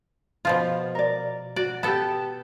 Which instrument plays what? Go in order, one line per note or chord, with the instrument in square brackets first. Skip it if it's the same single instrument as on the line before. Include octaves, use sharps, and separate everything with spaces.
[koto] B2 F3 F4
[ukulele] A#4 D5
[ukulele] F#4 [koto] D5
[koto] B3 A4 [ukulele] G4 A5